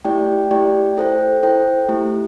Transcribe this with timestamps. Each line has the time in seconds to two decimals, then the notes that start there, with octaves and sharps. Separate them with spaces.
0.05 A3 E4 G4 D5 G5
0.51 A3 E4 G4 D5 G5
0.97 E4 A4 C5 G5
1.43 E4 A4 C5 G5
1.89 A3 E4 G4